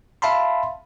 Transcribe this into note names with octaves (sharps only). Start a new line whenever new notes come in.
E5 F5 A5 B5 C6